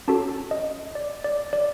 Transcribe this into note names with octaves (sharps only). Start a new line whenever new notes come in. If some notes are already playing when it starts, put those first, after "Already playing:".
C#4 F#4 A4 A5
D#5
D5
D5
D5